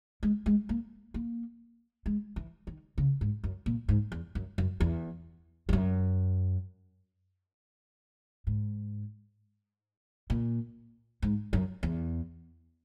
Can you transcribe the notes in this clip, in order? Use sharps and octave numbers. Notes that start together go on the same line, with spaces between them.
G#3
G#3
A#3
A#3
G#3
E3
D#3
C#3
G#2
F#2
A#2
G#2
E2
F#2
F#2
E2
E2
F#2
G#2
A#2
G#2
F#2
E2